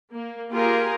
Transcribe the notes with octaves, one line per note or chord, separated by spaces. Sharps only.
A#3
A#3 F4 G4 G#4 A#4